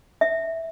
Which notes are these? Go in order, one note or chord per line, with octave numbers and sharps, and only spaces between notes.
E5